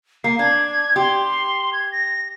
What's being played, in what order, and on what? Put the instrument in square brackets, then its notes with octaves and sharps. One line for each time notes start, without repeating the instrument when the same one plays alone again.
[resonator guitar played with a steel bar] A#3 [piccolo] C7
[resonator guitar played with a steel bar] D4 [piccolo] G#6
[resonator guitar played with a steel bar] G4 [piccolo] C6
[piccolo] G#6
A#6